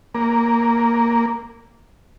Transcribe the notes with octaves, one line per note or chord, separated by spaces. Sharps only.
A#3